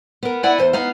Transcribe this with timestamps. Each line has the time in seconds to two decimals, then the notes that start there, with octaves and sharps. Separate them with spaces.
0.23 B3 A#4
0.43 E4 D5 F#5 G#5
0.58 E2 C5
0.73 B3 D#4 F5